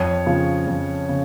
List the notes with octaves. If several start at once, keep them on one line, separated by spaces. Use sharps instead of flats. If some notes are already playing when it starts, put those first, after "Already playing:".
Already playing: F2 C#5
C#3 F3
F2
C#3